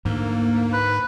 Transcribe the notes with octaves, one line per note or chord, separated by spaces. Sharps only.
D2 G#2 A#3
B4